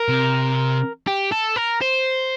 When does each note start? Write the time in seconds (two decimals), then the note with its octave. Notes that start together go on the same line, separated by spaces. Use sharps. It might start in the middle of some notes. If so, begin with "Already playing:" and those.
Already playing: A#4
0.08 C3
1.07 G4
1.32 A4
1.56 A#4
1.82 C5